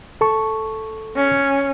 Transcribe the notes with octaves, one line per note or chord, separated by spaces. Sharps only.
A4 A5 C#6
C#4